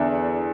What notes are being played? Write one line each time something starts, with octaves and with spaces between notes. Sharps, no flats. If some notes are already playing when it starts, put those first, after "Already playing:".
Already playing: E2 D3 D4 E5